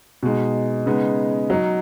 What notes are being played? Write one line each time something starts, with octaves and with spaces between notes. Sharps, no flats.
B2 G#3 D#4
C#3 G#3 B3 D#4
F#3 D#4